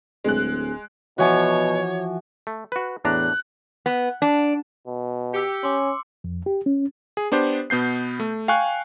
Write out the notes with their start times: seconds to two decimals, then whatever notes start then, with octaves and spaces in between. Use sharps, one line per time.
0.24 D1 G#3 F#6
1.18 B2 E3 F3 F#4 C#5 G#5 D6
2.47 A3
2.72 F#4 B4
3.05 E2 A2 D4 A#5 F#6
3.86 B3
4.22 D4
4.87 B2
5.34 G4 E6 C#7
5.63 C#4 C6 D6
6.24 F2
6.46 G4
6.66 C#4
7.17 G#4
7.32 B3 D4 G4 C5
7.70 B2 B3 G6 C7
8.20 A3
8.48 F5 G5 G#5 C#6 F#6